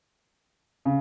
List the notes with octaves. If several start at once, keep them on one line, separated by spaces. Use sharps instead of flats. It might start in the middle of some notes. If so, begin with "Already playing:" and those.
C#3